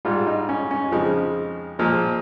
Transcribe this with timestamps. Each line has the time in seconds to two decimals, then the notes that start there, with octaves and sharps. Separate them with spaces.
0.05 G#2 G3 F4
0.27 D#4
0.49 C#4
0.71 C#4
0.91 F2 C#3 F3 G#3 D#4
1.79 A#2 F3 G#3